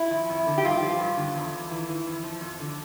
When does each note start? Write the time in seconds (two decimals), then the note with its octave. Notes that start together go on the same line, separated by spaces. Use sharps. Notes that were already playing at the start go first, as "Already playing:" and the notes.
Already playing: E4
0.11 F3
0.29 F2
0.47 D3
0.58 G4
0.64 G2 F4
0.82 F3
1.00 G2
1.17 D3
1.35 E2
1.53 E2
1.71 E3
1.89 E3
2.07 F2
2.23 F3
2.41 F2
2.60 D3